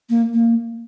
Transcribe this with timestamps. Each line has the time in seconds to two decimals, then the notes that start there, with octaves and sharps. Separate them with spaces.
0.09 A#3
0.33 A#3